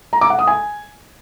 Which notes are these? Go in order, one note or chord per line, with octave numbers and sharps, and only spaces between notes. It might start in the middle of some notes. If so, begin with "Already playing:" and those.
A#5
D6
F#5
D#6
G#5